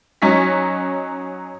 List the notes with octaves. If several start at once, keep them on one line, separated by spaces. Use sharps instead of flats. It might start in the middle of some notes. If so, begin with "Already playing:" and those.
F#3 C#4 D#4 B6